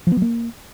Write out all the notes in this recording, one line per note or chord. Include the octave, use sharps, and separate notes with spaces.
F3
B3
F#3
A#3